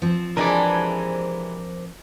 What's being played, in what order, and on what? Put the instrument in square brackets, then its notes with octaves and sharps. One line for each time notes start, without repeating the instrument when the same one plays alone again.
[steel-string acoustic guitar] F3 C4
[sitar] C3 E3 G#3 [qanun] D4 B4 B5 [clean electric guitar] A#4 D5